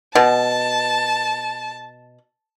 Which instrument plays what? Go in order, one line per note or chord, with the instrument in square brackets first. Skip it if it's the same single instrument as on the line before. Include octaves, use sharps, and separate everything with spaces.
[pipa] B2 [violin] A5